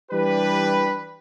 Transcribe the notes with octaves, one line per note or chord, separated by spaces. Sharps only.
E3 G3 D4 G4 B4